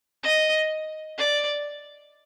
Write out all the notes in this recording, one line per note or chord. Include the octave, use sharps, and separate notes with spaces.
D#5
D5